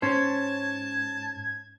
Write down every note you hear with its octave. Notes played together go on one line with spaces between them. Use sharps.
G#2 C#4 C5 A5 G#6